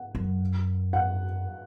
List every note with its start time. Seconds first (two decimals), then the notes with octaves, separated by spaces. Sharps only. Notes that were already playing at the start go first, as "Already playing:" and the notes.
Already playing: F#5
0.15 F#2
0.93 F#5